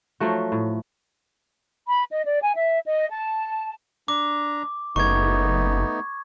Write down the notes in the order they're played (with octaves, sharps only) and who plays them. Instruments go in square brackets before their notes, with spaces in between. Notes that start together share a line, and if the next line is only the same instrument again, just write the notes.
[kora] F3 F#3 A3 F#4
A2
[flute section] B5
D#5
D5
G#5
E5
D#5
A5
[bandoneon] D4 A#5 [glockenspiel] D6
[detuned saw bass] F#1 [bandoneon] A3 B3 D#4 [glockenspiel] C#6 G#6